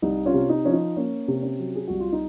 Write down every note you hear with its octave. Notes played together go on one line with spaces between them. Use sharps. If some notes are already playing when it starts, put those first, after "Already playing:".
C2 D#4
C#4 F4
C3
D#4
F3 C#4
D#4
A#3 C#4
C3
C#4
F#3
G#4
C2 F#4
F4
D#4